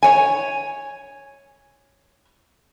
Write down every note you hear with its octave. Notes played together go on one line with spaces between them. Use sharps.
C#5 G#5